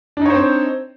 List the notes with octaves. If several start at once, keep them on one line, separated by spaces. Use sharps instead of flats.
C4 D4 D#4 C5 C#5